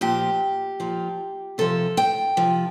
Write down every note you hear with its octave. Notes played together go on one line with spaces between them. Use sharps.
A#2 F3 G4
A#2 F3
C3 F3 A4
G5
C3 F3